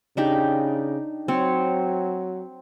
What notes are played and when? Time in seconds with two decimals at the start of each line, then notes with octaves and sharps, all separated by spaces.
0.17 C#3 D4 D#4 G4
1.28 F#3 C4 C#5